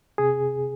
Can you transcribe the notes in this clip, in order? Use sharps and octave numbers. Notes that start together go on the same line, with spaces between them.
C3 G#4